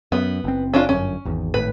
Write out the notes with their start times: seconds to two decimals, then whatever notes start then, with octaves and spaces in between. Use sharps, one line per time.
0.12 F#2 B3
0.44 F#1 C4
0.74 C#4 D4 F4
0.89 G1 F#2 C#4
1.25 G#1 E2
1.54 G#1 A2 B4